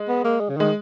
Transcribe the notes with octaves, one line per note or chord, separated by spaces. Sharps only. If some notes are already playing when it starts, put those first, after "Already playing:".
Already playing: G#3
B3
A#3
G#3
C#3
D#3 G#3